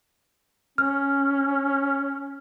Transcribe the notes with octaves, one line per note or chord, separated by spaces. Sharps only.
C#4 F6